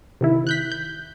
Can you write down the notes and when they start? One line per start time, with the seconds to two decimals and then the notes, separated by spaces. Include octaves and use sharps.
0.21 C3 D#3 E4
0.47 F#6 G6 B6
0.72 G6